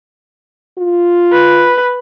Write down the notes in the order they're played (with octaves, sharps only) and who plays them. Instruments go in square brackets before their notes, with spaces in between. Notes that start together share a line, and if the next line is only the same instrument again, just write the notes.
[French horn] F4
[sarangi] B4